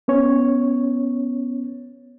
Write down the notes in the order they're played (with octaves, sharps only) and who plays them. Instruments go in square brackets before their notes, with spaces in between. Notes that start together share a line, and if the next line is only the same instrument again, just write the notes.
[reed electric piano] B3 C#4 C#5